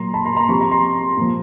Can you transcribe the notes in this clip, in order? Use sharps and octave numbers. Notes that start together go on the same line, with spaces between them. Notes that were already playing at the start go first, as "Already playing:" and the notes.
Already playing: A#2 F#3 A#5 C6
A5 B5
A#5 C6
A#5 C6
C3 F3 B5 C#6
A#5 C6
A#5 C6
A#2 F3